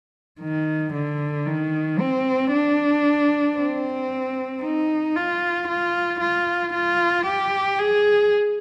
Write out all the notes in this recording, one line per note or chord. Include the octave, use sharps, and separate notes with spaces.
D#3
D3
D#3
C4
D4
C4
D#4
F4
F4
F4
F4
G4
G#4